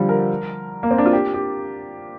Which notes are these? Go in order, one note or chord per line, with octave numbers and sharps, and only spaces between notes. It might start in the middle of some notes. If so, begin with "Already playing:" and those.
Already playing: D3 F3 G3
A#4
A#3
C4
D4
F4
G4
G4